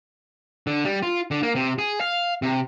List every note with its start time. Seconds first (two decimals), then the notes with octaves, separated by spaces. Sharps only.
0.67 D3
0.85 G3
1.03 F4
1.31 D3
1.43 A#3
1.55 C3
1.79 G#4
2.01 F5
2.42 C3